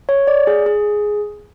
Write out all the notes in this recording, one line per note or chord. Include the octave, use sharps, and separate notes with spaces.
C#5
D5
G#4
G#4